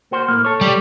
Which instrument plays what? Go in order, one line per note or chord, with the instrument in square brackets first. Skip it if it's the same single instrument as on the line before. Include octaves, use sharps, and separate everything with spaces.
[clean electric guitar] A#3 F#4 C5
A2 A#3
A4 C#5
[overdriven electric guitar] G3